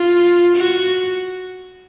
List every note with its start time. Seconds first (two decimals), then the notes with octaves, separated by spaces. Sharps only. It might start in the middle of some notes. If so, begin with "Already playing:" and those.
Already playing: F4
0.57 F#4